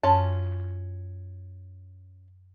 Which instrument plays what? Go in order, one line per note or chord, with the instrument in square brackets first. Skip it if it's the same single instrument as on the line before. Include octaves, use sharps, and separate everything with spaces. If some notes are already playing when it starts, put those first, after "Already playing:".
[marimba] F#2 [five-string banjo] C#4 F4 A5